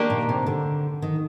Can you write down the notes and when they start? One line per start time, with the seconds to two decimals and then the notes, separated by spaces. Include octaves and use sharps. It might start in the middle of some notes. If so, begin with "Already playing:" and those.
Already playing: D#3 A#3 D4 G4 A#4
0.10 A#2
0.29 C3
0.47 D3
1.02 D#3